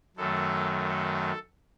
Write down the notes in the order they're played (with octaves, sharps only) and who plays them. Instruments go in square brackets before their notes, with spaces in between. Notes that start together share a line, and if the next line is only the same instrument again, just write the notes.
[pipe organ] F#2 D#3 F#3 A3 A4
A4